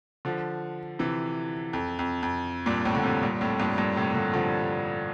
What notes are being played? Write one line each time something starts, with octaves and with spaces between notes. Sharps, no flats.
D3 F3
C3 E3
F2
F2
F2
G2 A#2
F2 A2
D3
A2 C3
G2 A#2
F2 A2
G2 A#2
G2 A#2
A2 C3
A#2 D3
D3 F3